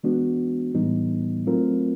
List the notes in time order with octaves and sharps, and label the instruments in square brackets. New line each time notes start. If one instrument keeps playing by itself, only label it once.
[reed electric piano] E3 G#3 B3 D4 F#4
A2 E3 G3 B3 D#4
F#3 A3 C4 F4 A#4